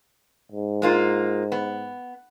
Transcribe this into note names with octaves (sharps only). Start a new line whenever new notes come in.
G#2
G#3 A#3 F4
B3